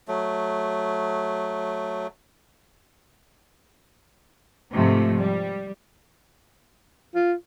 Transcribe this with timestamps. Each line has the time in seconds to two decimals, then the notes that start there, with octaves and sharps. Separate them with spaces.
0.08 F#3 A3
4.73 G#2 C3 F3 A3
5.19 G3
7.15 F4